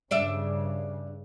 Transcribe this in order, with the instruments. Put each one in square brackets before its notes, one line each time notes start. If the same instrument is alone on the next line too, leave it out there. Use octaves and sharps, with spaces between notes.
[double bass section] G2 C#3 [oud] D4 D5 E5